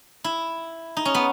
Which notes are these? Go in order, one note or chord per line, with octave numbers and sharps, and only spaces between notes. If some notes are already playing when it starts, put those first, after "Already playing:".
E4
D#4
C#4
B3